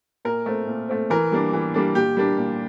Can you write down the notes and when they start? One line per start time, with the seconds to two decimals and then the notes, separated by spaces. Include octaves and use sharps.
0.25 A#2 A#4
0.46 A3 C4
0.67 A#2
0.89 A3 C4
1.10 E3 A#4
1.32 G3 A#3 D4
1.53 E3
1.74 G3 A#3 D4
1.95 A#2 G4
2.17 G3 A#3 D4
2.38 A#2